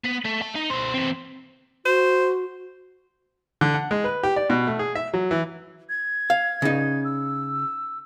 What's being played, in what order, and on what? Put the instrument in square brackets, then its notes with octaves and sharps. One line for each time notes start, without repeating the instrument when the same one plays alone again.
[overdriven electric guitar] B3
A3
E5 A5
D#4
B2 C5
E3 C4
[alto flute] F#4 [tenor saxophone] C5
[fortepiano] D3
F#5
G#3
B4
G4
D5
B2
A3
G#4
E5
F#3
E3
[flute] G#6
[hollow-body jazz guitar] F5
C#3 D#4
[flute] E6